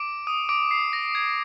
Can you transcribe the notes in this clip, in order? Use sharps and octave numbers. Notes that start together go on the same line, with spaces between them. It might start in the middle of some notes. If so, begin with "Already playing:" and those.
Already playing: D6 D7
D#6 D#7
D6 D7
C7
A#6
G#6